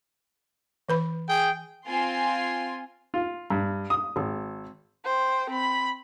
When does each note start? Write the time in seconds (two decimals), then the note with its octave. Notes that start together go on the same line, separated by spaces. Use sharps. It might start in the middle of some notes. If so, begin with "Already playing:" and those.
0.89 E3 B4 B5
1.27 G#4 G5
1.87 C4 F4 G#5 C6
3.14 F4
3.50 G2
3.90 D#6
4.16 G#1
5.05 C5 G5
5.50 C4 B5